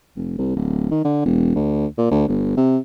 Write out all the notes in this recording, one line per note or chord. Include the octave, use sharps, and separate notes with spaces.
F1
C2
D1
D#3
D3
E1
D2
A#2
D2
G1
C3